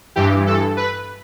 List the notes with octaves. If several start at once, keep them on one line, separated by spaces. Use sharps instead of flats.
G2 E3 G4
A4
B4